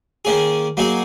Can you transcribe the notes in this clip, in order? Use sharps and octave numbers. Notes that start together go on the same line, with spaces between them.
D#3 A#3 C#4 G#4
F#3 A#3 D#4 G#4